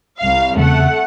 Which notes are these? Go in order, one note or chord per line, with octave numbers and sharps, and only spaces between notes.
C2 F5
E2 C#3 A3 F#5